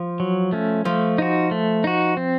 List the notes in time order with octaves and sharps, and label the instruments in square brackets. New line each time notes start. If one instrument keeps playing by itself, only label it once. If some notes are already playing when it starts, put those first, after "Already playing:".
Already playing: [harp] F3
[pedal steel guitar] F#3
A3 C#4
[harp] F3 [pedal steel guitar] A3
[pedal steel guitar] D#4 F#4
A3
D#4 F#4
C4